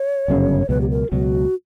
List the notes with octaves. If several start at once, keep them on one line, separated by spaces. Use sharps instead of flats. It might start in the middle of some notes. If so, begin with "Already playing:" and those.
Already playing: C#5
G1 F#2 C#3
C#2 B2 F#3 B4
G4
A#4
C#2 B2 F#3 F#4